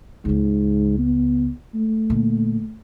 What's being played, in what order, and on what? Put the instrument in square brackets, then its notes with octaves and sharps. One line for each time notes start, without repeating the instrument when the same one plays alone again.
[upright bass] C#2 C#3 [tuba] G#2
[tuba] B3
A3
[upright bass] A#2 D3